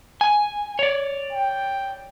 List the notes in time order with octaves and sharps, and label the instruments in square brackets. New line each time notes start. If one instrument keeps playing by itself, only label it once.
[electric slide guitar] G#5
C#5 D5
[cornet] G5